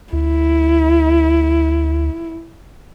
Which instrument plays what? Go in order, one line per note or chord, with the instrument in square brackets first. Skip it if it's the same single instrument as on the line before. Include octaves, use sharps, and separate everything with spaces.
[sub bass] D2 [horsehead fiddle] E4